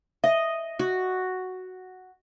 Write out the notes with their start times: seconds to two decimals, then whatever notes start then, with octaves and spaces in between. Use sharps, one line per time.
0.24 D#5 E5
0.79 F#4